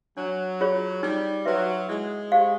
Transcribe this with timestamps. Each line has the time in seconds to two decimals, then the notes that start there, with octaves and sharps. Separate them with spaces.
0.17 F#3 D4
0.61 F4 G#4 C#5
1.03 G3 D#4
1.46 F#3 F#4 B4 E5
1.89 G#3 E4
2.31 G4 C5 F5